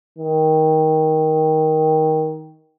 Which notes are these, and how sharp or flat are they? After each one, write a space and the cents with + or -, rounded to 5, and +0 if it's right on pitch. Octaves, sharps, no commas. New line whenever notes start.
D#3 +15